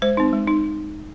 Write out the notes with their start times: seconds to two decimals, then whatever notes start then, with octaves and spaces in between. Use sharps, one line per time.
0.02 G#3 C5
0.17 C4 D#4
0.33 G#3
0.48 D#4